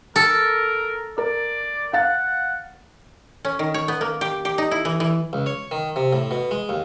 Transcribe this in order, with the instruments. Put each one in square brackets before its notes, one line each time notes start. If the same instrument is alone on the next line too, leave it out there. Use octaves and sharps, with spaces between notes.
[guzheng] A4 [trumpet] A#4
[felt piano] A#4 [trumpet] D5
[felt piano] F5 A6 [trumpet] F#5
[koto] C#4
D#3
C#5
B3
A#3
G4
G4
D#4
E4
E3
E3
[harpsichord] C#2
C#5
D#3
C3
A2
B2
G#3
D#2